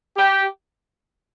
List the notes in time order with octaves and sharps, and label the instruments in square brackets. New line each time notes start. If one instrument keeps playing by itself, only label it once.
[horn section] G4